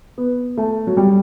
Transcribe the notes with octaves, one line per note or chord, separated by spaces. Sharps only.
B3
A3
F#3
G3